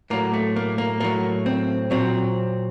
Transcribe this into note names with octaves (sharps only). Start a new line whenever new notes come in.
A2 F#3 A#3
A3
A#3
A#3
A2 F#3 A#3
C4
A#2 F#3 C4